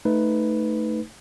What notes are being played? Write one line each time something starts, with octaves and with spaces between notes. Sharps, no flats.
A3 D#4 B4